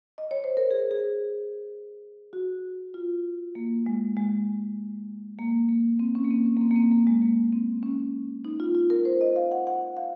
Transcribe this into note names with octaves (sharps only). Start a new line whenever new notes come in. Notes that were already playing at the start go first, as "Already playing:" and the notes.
D#5
C#5
C5
A#4
G#4
G#4
F#4
F4
A#3
G#3
G#3
A#3
A#3
C4
C#4
A#3
C4
C#4
A#3
C4
A#3
C4
A#3
G#3
A#3
C4
C#4
D#4
F4
F4
A#4
C5
D#5
F5
F#5
F#5
F5